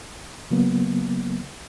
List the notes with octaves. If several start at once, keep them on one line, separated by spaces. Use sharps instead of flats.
C#3 F#3 A#3 B3